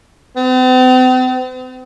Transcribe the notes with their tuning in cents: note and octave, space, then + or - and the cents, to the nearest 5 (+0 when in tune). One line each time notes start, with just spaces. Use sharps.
C4 -45